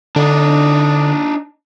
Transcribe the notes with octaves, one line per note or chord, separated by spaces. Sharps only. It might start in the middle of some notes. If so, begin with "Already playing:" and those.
D3 D4 D#4